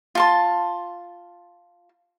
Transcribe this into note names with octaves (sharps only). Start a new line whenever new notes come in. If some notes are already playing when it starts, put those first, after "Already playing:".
F4 A5 C6